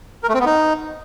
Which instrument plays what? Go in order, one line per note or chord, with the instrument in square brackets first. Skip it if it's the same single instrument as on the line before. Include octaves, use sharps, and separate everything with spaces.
[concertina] A#4
A3
C4
B3
D#4